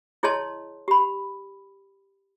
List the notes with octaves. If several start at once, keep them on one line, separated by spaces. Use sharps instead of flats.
E4 G#4 C#5 D#5 A5 C6
G4 B5